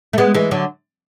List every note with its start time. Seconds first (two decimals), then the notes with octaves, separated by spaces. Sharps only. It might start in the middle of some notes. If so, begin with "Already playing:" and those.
0.13 A3
0.18 G#3 B3
0.34 E3 G#3
0.51 D3 F#3